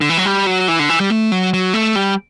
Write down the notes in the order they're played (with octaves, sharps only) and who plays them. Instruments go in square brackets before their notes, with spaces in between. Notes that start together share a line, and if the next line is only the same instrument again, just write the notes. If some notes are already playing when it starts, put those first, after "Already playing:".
[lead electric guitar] D3
E3
F#3
G3
F#3
E3
D3
E3
G3
A3
F#3
F#3
A3
G3